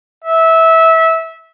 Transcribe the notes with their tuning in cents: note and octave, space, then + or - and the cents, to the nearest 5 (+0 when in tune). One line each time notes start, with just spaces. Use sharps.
E5 -20